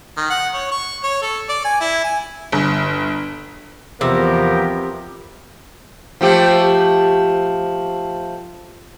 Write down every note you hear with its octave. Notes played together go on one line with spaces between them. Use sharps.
D#3
F#5
C#5
C#6
C#5
A4
D5
G#5
E4
G#5
G1
E2 C3 F3 B3 G4 A#4
F3 A3 G4